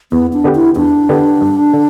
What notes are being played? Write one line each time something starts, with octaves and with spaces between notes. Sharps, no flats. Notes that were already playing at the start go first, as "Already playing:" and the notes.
E2 B3
D4
D3 B3 G4 B4
E4
E2 D4
D3 B3 G4 B4
G2
D3